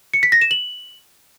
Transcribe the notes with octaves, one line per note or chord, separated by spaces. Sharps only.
C#7
B6
A#6
E7
F#7